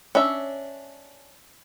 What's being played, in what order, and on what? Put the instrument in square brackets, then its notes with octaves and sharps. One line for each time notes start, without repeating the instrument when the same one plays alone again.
[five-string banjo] C#4 D4 E5